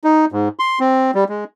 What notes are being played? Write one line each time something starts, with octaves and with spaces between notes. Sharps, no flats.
D#4
G#2
C6
C4
G3
G#3